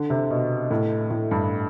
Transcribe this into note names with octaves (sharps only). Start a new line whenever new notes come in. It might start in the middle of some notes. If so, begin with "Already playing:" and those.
Already playing: D3
C3
B2
A2
A2
G2